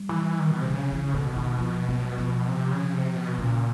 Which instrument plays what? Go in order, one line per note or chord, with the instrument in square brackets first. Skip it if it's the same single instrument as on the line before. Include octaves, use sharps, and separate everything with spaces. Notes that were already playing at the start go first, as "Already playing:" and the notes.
Already playing: [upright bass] G3
[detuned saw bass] E3
D#3
B2
C3
[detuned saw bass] C#3 [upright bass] F#3
[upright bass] E3
[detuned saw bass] B2 [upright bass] D3
[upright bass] D#3
F3
F#3
F3
[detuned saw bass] C3
C#3
C3
B2
[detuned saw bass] A#2 [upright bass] C#3